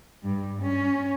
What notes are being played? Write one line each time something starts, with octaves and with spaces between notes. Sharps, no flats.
G2
C#4